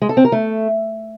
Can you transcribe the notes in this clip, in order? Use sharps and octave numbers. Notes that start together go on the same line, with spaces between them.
G#3
A4
C4
A#4
A3